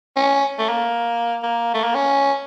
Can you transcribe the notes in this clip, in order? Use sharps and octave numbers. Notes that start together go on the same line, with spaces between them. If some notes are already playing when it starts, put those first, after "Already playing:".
C#4
A3
A#3
A#3
A3
A#3
C#4